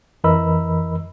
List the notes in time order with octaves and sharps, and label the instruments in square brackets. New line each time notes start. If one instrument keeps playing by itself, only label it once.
[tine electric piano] F2 E3 A#4 D#5 B5 E6